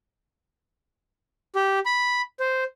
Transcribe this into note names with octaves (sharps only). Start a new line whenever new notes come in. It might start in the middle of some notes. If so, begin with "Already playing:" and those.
G4
B5
C5